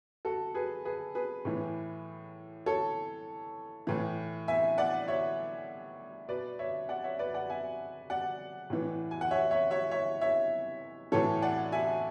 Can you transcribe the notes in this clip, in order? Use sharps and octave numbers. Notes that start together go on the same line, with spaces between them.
F#4 A4
G#4 B4
G#4 B4
G#4 B4
A2 E3
A4 C#5
A2 E3
E5 G#5
D5 F#5
C#5 E5
B2 B4 D5
C#5 E5
D5 F#5
C#5 E5
B4 D5
D5 F#5
E5 G#5
D5 F#5
A2 E3
G#5
F#5
C#5 E5
C#5 E5
C#5 E5
C#5 E5
C#5 E5
A2 E3 A4 C#5
D5 F#5
E5 G#5